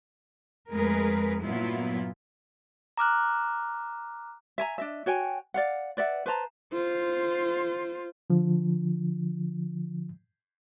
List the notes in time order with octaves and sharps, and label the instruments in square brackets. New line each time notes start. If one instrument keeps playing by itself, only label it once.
[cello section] F2 G#3 A3 G#4 A#4 B4
G2 A#2 F#3 B3 E4 F4
[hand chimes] A#5 D6 F6 F#6
[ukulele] E5 G#5 A#5
D4 D#5 E5
F#4 C#5 G5 G#5
D5 F5 F#5
B4 D5 E5 F#5
B4 C5 A5 A#5
[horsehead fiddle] F4 C5
[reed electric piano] D3 F3